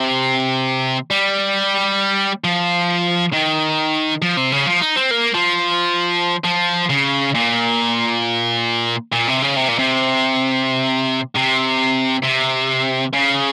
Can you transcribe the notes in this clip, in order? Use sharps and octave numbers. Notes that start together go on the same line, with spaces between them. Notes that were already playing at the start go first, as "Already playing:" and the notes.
Already playing: C3
G3
F3
D#3
F3
C3
C#3
F3
D#4
C4
A#3
F3
F3
C#3
A#2
A#2
C3
C#3
C3
A#2
C3
C3
C3
C#3